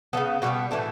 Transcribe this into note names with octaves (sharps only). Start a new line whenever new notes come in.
C#3 F#3 B3 A4
B2 G3 B3 F#4
A2 E3 A3 D4